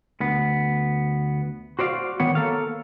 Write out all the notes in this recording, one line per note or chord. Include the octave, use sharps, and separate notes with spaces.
D2 B3
F#4 C5 D5 E5 F5
D#3 B3 C#5
A#3 A4 C#5 F5